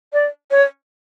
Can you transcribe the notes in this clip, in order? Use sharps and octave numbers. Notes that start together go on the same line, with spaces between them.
D5
C#5